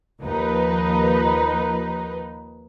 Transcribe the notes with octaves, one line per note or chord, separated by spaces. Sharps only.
D#2 F3 D#4 B4